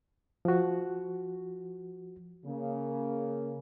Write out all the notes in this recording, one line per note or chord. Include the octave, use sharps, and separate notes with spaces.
F3 F#4
C#3 A#3